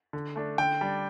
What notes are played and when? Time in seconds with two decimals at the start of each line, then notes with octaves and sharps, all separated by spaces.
0.13 D3
0.36 A3 D4
0.58 D3 G5
0.81 G3 D4